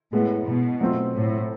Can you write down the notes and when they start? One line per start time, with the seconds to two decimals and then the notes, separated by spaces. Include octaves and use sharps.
0.13 A2 G#3 B3 E4
0.46 B2
0.81 F#3 A3 C4 F4
1.14 A2